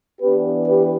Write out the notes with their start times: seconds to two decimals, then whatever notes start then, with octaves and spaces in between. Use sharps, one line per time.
0.21 E3 B3 D4 G4 B4
0.68 G4 B4